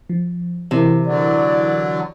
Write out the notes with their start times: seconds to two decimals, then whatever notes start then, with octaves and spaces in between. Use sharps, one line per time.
0.09 F3
0.71 C3 E3 E4 A#4
1.07 D3 F#3 D5